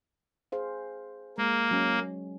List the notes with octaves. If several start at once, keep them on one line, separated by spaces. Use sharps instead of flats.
G#4 C5 F5
G#3 A#3
F#3 C#4